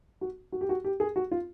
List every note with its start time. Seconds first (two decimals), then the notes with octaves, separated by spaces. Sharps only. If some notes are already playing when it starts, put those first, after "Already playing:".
0.21 F#4
0.52 F#4
0.61 G4
0.69 F#4
0.84 G4
1.00 G#4
1.16 F#4
1.31 F4